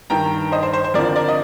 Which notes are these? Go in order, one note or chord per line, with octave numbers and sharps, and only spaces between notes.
G2 D#3 G5 A#5
C5 D#5
C5
C5
C5
F2 D3 F3 A#4 D5
A#4 D5
D#5